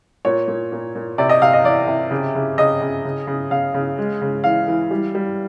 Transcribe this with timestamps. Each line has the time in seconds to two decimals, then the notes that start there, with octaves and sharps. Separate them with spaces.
0.25 A#2 C#5
0.48 A#2
0.72 A#2
0.95 A#2
1.18 C3 D5
1.29 D#5
1.42 C3 F5
1.53 D#5
1.64 E3 D5
1.88 C3
2.11 C#3
2.35 C#3
2.58 C#3 D#5
2.81 C#3
3.05 C#3
3.27 C#3
3.51 C#3 F5
3.74 C#3
3.98 G#3
4.22 C#3
4.44 E3 F5
4.68 E3
4.91 G3
5.15 G3